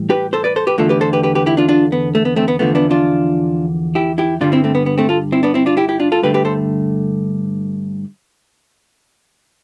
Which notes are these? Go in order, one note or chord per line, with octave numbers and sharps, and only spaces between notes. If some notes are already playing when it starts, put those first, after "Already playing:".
Already playing: A2 E3 G3
G4 B4
A4 C5
B4 D5
A4 C5
G4 B4
E2 D3 A3 F4 A4
G4 B4
A4 C5
G4 B4
G4 B4
G4 B4
E4 G4
D4 F4
D4 F4
B3
A3
B3
A3 C4
B3
E2 D3 F3 A3 B3
B3 D4
D4 F4
E4 G4
E4 G4
G2 D3 G3 D4 F4
C4 E4
A3 C4
B3
B3
A3 C4
F4 A4
C4 E4
B3 D4
C4 E4
D4 F4
E4 G4
E4 G4
D4 F4
F4 A4
G2 D3 A3 G4 B4
G4 B4
A4 C5